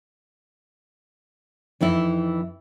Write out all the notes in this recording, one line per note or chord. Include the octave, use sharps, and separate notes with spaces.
F2 E3 D#4 E4